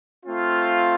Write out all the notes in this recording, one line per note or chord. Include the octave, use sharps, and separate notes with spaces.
A3 C4 F4